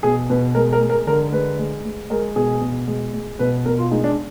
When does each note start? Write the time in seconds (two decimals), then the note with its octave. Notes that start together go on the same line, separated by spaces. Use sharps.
0.03 B2 G#4
0.29 B2 B4
0.55 G#3 A#4
0.73 A#4
0.81 G#3
0.90 A#4
1.07 D3 A#4
1.32 G#3 B4
1.59 G#3
1.85 G#3
2.10 G#3 A#4
2.36 B2 G#4
2.61 B2
2.87 G#3
3.14 G#3
3.39 B2 B4
3.66 B2 A#4
3.78 F4
3.91 G#3 D#4
4.04 D4